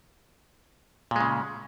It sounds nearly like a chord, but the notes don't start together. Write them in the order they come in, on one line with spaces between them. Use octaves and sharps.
A#2 G#3 C#3